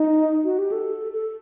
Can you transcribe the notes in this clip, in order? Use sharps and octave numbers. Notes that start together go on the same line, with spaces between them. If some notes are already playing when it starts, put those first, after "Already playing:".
Already playing: D#4
F#4
G4
A4
A4